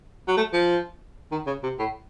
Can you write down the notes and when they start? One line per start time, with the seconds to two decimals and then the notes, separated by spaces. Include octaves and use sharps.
0.28 F#3
0.37 A3
0.53 F3
1.32 D#3
1.47 C#3
1.63 C3
1.79 A2